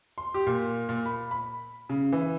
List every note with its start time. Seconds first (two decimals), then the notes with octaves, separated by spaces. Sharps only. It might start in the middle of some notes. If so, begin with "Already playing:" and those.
0.18 C6
0.34 G4
0.46 A#2
0.89 A#2
1.06 B5
1.31 B5
1.89 C#3
2.12 E3